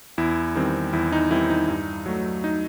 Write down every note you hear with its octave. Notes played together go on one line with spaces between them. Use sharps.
E2 E4
D#3 G3 C4
E2 E4
D#4
D#3 G3 C4 E4
D#4
G2
F#3 A3
D#4